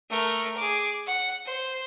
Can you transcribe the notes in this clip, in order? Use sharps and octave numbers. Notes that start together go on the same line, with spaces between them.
A3 A#4
G#4 D6
F#5
C5